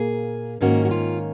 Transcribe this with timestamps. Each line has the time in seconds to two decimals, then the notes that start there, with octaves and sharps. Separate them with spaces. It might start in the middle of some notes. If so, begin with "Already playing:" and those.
Already playing: A#2 A#3 G#4
0.61 G#2 D#3 A#3 C#4 F#4
0.85 F#4
0.91 F4